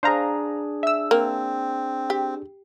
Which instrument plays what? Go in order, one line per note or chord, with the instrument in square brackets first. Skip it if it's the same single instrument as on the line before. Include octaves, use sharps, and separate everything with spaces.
[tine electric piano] D4 G#4 [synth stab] C5 F5 A#5
[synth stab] E5 E6
[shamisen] A#3 [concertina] C4
[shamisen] G4